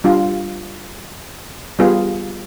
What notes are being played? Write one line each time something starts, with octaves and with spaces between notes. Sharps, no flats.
G3 D4 F4
G3 B3 F4 G#4